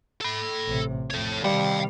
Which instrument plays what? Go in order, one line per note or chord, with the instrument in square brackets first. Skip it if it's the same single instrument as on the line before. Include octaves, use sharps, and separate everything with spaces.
[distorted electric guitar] A4 B5
[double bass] A1 C3
[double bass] F2 A2 [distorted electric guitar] A4 C#5
[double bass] C3 D#3 [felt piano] G3 [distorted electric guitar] F5 G5